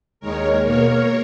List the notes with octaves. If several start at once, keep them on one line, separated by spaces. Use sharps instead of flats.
D#2 D#3 G#3 A#4 C#5
B2 A#3 A#4 C#5